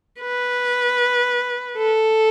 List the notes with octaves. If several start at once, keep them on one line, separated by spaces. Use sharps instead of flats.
B4
A4